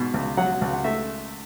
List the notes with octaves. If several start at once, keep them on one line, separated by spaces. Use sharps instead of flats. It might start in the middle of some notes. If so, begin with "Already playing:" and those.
Already playing: G#2 B2
C#2
F#3 F#5
C#2
F#5
A3 E5